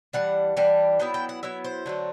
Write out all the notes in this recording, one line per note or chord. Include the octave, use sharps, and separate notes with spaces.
E3 G3 D4 F#5
E3 G3 D4
F#3 B3 E4 G5
G5
F#5
F#3 B3 E4 E5
C5
D3 F#3 A3